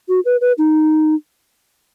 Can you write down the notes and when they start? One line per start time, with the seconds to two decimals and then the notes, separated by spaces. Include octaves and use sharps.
0.09 F#4
0.25 B4
0.41 B4
0.58 D#4